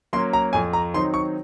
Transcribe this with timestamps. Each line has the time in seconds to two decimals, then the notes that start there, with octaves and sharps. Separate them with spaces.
0.13 F#3 A#3 C#4 C6
0.33 A#5
0.53 F2 G#5
0.73 A#5
0.94 D#3 F#3 C4 D#4 C6
1.14 C#6